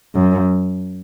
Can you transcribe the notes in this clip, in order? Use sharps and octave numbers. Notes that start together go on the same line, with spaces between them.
F#2